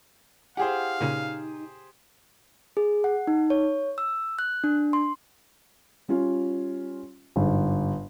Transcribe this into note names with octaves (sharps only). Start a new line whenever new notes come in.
E4 G4 G#4 C5 F5 F#5
A#2 C#3 D#4
G#4
F#5
D#4
C#5
E6
F#6
D4
C6
G3 C#4 F4
G1 G#2